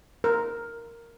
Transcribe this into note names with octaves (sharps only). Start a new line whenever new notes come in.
A#4